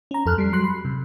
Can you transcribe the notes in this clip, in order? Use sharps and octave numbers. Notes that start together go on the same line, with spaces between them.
C#4 A#5
F2 A4 F6 F#6
G3 C7
F#3 C6 F#6 C7
B5
C3